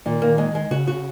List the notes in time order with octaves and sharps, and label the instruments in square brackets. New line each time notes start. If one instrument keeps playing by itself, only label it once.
[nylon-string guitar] A#2 [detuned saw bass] D#3
[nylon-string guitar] A#3
G#3
G#3
[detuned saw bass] C#3 [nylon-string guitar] F#4
[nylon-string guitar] F#4